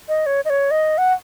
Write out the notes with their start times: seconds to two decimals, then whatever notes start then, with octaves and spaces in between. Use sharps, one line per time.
0.08 D#5
0.26 C#5
0.45 D#5
0.50 C#5
0.71 D#5
0.98 F#5